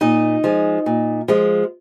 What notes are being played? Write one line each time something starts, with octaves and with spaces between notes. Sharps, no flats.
A#2 D#4 D#5
F3 G#3
A#2
F3 G#3